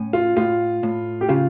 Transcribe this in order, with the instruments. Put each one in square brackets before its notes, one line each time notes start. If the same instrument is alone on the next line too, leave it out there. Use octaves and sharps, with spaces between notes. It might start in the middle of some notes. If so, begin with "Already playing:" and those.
Already playing: [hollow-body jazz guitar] A2 C#4
[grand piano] F4
[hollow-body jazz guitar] A2 [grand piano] F4
[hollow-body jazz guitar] A2
[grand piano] G4
[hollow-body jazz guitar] C#3 [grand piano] F4